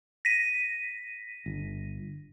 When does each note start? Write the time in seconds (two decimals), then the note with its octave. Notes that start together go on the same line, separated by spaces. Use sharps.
0.25 A#6 B6 D#7
1.46 G1